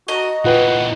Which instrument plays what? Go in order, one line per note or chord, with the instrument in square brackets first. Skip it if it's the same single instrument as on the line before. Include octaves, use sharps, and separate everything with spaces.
[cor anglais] F#4 [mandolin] D#5 A#5
[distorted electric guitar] A#2 E3 [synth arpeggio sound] F4 B4 G5 [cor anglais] F#5